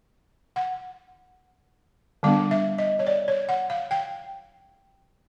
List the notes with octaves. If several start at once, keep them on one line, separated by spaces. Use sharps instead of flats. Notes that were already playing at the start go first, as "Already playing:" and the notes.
F#5
D3 G3 B3 D4 F5
E5
D#5
C#5
D5
C#5
F#5
F5
G5